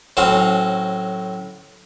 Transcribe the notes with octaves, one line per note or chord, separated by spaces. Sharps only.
A2 F#3 C4 C#4